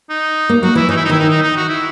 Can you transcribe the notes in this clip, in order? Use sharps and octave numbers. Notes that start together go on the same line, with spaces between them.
D#4
A#3
F#3 F#4
E3 E4
E3 D#4
E4
D#4
D#3 E4
D#4
D#4
D#4
F#4
E4